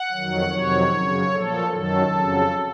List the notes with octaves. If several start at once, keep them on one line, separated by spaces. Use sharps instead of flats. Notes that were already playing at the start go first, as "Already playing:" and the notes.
Already playing: F#5
F2 D#3 F#3
F2 C3 D#3 F#3 C#5
F#2 C#3 F#3
A#2 F3 A4
F#2 D#3 F#3 A4
F2 C#3 F#3